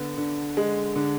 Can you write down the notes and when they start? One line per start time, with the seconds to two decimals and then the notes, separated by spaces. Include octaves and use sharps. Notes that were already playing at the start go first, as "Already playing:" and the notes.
Already playing: D3 B3
0.18 D3
0.57 G#3
0.96 D3